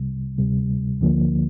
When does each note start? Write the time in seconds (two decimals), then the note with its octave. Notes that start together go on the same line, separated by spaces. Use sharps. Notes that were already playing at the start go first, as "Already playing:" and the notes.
Already playing: C2 C3 G3
0.38 D2 C3 G3
1.01 D2 D3 F3 A#3